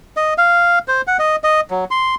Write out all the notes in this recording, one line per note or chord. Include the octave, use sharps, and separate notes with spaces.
D#5
F5
C5
F#5
D#5
D#5
F#3
C6